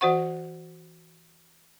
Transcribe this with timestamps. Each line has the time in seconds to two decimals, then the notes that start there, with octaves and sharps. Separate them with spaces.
0.01 E3 F#4 C5 F#5 C#6